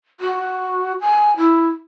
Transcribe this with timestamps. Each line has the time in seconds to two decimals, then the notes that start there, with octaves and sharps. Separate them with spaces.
0.21 F#4
1.01 G#5
1.37 E4